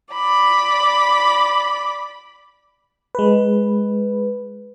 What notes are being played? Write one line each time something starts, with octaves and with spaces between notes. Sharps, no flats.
D5 B5
G#3 B4